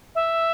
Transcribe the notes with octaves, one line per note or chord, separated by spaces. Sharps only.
E5